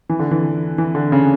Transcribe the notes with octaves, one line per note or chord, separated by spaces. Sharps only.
E3
D3
E3
E3
D3
C#3